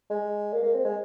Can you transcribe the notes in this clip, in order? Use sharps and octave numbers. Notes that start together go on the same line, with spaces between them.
G#3
A#3
A#3
C4
G#3